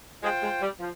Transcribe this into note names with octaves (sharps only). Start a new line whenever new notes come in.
G#3 F4 C5 G5
G#3
G3
F3